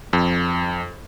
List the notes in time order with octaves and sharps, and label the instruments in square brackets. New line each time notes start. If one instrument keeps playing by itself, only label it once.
[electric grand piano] F2